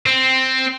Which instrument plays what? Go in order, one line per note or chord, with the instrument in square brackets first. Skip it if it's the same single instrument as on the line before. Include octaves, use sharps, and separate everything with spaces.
[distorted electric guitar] C4